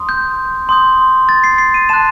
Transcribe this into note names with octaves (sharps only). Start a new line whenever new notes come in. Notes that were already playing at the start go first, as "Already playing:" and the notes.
Already playing: C6 D#6
G6
C6 D#6 G6
A6
C7
C7
D#7
A5 C6 F#6 E7